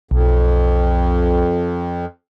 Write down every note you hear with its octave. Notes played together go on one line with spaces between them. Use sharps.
B1 F2